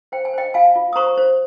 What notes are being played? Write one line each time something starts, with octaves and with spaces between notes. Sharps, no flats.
C5 G5
G#5
C5 D#5 G5
F4 F5 G#5
F4
D#6
C5 A#5 C#6
C5